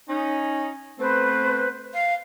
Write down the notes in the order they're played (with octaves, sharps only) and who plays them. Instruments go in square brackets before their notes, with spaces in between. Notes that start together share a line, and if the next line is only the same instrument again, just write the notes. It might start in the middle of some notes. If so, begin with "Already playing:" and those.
[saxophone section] C#4 D#4
[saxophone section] A3 B3 C4 [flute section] B4 C5
[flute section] F5